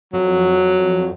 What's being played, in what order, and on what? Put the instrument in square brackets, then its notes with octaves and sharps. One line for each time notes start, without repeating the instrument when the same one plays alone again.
[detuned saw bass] F2 [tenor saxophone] F#3